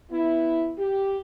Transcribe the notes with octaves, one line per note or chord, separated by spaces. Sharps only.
B3 E4
G4